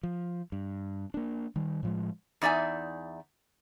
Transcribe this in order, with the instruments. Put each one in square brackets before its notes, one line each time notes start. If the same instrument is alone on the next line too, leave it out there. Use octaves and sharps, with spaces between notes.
[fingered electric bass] F3
G2
A#3 D4
D#3 G3
A2 F3 G#3
[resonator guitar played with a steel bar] E2 D#4 D5 E5 G#5